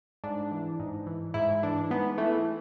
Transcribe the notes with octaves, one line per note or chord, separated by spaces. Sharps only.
G#2 D4
E3
G#2
E3
G#2 E4
E3 D4
G#2 B3
E3 A3